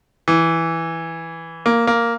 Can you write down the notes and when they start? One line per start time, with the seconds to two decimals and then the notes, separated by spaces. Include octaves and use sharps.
0.28 E3
1.66 A#3
1.87 A#3